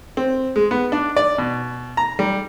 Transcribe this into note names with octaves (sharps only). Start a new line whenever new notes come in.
C4
G#3
B3
D4
D5
B2
A#5
G3